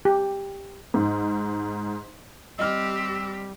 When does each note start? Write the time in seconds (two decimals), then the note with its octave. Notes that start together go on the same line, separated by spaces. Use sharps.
0.05 G4
0.94 G#2
2.59 G3 C4 G4 D#5 E6 F6